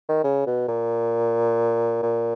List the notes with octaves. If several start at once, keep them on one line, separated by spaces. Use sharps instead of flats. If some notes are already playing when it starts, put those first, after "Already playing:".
D#3
C#3
B2
A#2
A#2